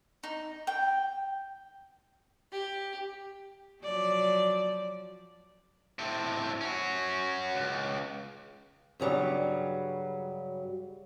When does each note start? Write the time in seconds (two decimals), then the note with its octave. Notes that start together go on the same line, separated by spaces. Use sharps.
0.23 D#4
0.67 G5
2.52 G4
3.83 F3 F#3 D5
5.99 A2 C4
6.61 C#4 F#4
7.54 C#2
9.00 G2 C#3 F#3 G3